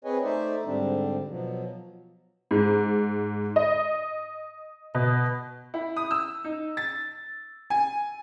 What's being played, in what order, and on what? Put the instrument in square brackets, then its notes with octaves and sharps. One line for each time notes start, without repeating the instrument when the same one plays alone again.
[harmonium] C4 G#4 B4 C#5 D#5 G#5
A3 D#4 C5 D5 E5
G#2 D3 G3 C4 D4
B2 F3 F#3
[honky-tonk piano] G#2
D#5
B2
[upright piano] E4
D#6
E6
D#4
A6
G#5